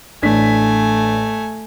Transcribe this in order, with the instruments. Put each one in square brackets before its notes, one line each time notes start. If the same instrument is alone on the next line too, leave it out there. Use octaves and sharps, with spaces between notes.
[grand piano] A1 D4 B6 [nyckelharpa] A3 G#5